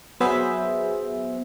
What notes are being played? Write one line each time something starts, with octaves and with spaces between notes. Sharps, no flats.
F#3 B3 G#4 C5 E5